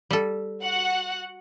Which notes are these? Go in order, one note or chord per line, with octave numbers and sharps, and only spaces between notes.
G3 A4
F#4 F#5